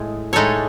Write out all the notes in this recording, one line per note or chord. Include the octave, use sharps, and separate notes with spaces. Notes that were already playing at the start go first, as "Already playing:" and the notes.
Already playing: A2 G#3
A2 G#3 D#4 A4 C#5